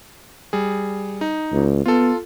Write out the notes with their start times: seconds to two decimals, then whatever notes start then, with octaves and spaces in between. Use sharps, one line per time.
0.53 G3 G#4
1.21 D#4
1.53 C#2
1.86 B3 F4 A4